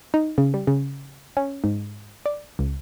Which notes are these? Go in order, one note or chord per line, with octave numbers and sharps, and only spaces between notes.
D#4
C#3
G3
C#3
C#4
G#2
D5
C#2